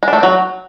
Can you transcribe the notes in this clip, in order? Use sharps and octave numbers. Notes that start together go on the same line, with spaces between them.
G#3
D4
A3
C4
F#3